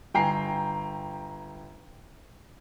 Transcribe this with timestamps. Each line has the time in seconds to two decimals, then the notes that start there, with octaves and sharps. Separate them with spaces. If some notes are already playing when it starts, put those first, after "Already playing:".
0.14 G1 G5 G#5 A#5 C7